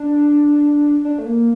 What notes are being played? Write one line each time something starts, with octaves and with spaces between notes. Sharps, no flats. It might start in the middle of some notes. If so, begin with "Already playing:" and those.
Already playing: D4
D4
A3
A#3